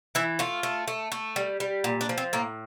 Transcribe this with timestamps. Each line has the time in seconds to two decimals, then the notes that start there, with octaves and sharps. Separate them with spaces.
0.15 E3 E4
0.39 A3 F4
0.63 A3
0.88 A3
1.12 A3
1.36 G3
1.60 G3
1.84 A#2
2.01 D4
2.09 F3
2.18 C4
2.33 A2 A#3